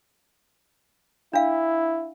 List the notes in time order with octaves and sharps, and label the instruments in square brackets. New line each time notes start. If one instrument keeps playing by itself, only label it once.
[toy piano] D4 F5 [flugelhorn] E4